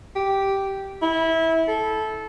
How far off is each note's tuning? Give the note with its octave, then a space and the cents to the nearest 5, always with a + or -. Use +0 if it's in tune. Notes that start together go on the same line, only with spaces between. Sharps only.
G4 -5
E4 -20
A4 -15